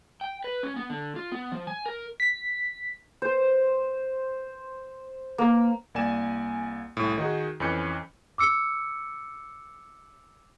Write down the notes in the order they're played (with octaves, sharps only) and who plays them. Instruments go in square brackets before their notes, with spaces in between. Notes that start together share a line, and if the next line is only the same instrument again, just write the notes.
[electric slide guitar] G5
B4
C#4
B3
D3
F4
B3
F3
G#5
A#4
[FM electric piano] B6
[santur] C5
A#3
[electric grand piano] C2 A#3 D5 G#5 E7
C2 A2
D#3 D#4 F#4 G#4
F2 E3 C#4 B4 G6 C#7
[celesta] D6 E6 C#7